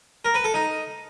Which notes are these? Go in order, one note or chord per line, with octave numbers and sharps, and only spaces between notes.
A#4
B4
A4
D#4